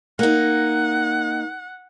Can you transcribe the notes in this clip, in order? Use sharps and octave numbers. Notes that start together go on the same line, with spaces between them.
A#3 D#4 F#5